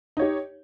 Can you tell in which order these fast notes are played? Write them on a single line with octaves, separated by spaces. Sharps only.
D#4 C#5 G4